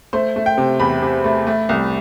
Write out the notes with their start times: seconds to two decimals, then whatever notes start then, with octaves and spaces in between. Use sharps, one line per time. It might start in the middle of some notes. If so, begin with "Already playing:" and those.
0.13 A3 C5
0.36 A3
0.46 G5
0.57 C3
0.80 E2 B5
1.02 C3
1.24 A3
1.47 A3
1.69 C2